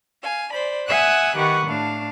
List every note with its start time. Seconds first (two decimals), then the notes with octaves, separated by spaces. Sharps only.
0.23 F5 G#5
0.53 C5 D5 B5
0.87 E5 F#5 G#5 D#6 E6 F#6
1.36 D#3 G4 B4 F#5 C#6
1.67 A2 D4 F5 A5